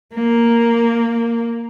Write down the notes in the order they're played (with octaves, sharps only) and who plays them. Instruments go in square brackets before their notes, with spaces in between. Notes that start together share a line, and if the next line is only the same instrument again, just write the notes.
[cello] A#3